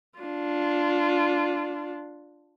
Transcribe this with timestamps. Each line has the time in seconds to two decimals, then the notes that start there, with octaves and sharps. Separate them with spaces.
0.19 D4 F4